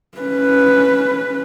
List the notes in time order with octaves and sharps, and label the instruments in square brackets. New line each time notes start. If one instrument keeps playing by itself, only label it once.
[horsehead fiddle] C#4 B4